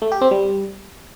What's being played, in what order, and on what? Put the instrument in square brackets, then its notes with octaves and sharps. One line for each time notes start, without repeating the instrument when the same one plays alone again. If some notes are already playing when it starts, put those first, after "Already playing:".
[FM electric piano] A3
G4
C4
G3